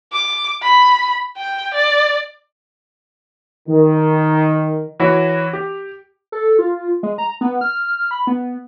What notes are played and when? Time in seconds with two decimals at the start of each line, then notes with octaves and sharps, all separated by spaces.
0.13 D6
0.62 B5
1.38 G5
1.74 D5
3.69 D#3
5.00 E3 E4 F#4 C#5
5.53 G4
6.32 A4
6.59 F4
7.03 G#3
7.18 A#5
7.41 B3
7.61 F6
8.11 B5
8.27 B3